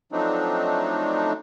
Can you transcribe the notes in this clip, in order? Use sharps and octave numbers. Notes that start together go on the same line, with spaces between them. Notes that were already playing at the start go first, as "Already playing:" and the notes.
F3 F#3 A3 C4 D4 D#4